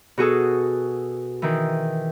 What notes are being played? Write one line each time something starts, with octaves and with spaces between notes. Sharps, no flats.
B2 F#4 G#4 A4
D#3 E3